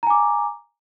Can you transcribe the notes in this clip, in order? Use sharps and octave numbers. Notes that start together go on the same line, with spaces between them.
G#5 A#5 D6